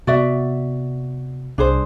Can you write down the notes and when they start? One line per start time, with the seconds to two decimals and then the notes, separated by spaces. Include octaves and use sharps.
0.07 C3 B3 F#4 D5 E5
1.58 C2 D4 G#4 C5